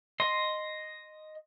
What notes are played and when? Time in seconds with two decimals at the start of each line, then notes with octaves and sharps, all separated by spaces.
0.20 D#5 C6